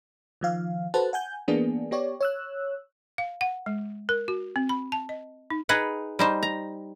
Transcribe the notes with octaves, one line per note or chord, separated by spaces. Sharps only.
D#3 F3 F5
F#4 A4 B4 C5 A5 F#6
F#5 G#5 G6
E3 A#3 B3 D4 G#4
B3 G4 C#5 D5
C#5 E6 F#6
F5
F#5
G#3
A#4
F#4
C4
B5
A5
D#5
D#4
D#4 G#4 B4 F#5
G3 D#4 C5
A#5